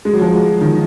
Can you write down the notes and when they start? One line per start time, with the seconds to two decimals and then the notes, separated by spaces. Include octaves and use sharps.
0.05 G#3
0.13 F#3
0.21 F3
0.30 F#3
0.61 D#3